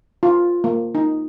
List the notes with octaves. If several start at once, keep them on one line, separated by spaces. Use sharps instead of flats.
F4
A#3
D#4